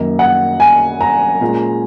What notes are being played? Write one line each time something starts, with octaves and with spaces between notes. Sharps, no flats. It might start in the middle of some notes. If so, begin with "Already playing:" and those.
Already playing: F#2 D#3 A#3
F#5
G#5
A#5
A#2 G#3 C#4